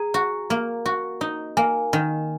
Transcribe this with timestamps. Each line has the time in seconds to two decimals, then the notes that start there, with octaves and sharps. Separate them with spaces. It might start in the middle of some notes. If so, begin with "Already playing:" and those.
Already playing: G#4 A#5
0.14 F#4
0.50 A#3
0.86 F#4
1.21 D#4
1.57 A#3 G#5
1.93 D#3